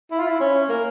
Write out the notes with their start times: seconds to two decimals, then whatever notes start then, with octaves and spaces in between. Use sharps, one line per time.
0.11 E4
0.20 F4
0.27 E4
0.40 C#4
0.69 A#3